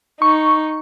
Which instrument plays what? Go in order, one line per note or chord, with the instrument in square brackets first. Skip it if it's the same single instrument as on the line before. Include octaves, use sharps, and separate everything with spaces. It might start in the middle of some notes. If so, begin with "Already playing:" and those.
[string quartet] D#4 [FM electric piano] C#6